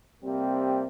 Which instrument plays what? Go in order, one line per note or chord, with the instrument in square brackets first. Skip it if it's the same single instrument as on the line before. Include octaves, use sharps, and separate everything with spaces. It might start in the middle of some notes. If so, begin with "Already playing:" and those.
[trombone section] C3 G3 A#3 C4